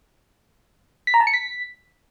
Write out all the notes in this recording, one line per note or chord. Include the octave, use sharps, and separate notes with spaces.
B6
A#5
A5
C#7
B6